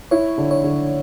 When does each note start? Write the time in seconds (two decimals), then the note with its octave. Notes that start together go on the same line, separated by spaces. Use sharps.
0.11 E4 C#5
0.38 D3
0.51 C#5
0.64 D3